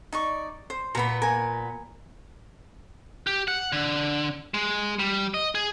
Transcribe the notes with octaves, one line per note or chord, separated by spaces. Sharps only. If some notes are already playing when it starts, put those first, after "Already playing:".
D#4 D5 C#6
C5
A#2 B3 A#5 B5
A#4 G#5
G4
F#5
D3
G#3
G3
D#5
G#4